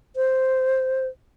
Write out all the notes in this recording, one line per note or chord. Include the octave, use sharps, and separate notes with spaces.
C5